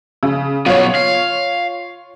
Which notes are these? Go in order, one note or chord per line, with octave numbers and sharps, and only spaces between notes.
C#3
F#3 B3 F4 C#5
F5